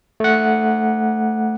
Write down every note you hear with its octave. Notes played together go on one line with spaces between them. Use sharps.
A3 F#5